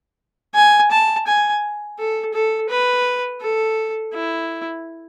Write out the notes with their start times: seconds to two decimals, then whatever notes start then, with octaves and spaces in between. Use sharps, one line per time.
0.55 G#5
0.92 A5
1.27 G#5
1.99 A4
2.34 A4
2.70 B4
3.42 A4
4.14 E4